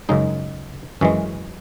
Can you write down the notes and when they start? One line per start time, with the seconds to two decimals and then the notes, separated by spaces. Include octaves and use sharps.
0.09 F#2 C#3 G#3 D#4
1.01 F#2 E3 G#3 C#4